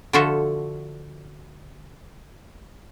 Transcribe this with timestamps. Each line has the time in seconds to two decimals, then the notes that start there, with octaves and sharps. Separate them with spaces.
0.13 D3 F3 F4 F#4 A4 E5